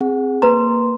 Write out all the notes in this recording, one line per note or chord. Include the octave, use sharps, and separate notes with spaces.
C4 G#4 F#5
A#3 B4 A#5 C6